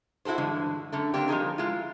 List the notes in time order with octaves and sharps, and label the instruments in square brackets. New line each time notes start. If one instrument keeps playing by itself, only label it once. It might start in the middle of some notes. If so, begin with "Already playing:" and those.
[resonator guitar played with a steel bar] E4 F#4 G4 A4 C5
G2 D3 E3 G#3
F#2 D3 A3
D3 A#3 C4 D4 G4
F3 G3 D#4 G#4 A#4
G#3 E4 F4